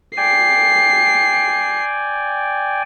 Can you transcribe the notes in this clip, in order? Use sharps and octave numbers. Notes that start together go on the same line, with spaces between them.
D5 G5 G#5 C7